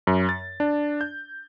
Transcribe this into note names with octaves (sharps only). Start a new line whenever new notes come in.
F#2
A6
D4
G6